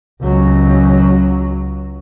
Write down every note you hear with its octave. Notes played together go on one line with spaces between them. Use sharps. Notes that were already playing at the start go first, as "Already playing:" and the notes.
C#2 F#3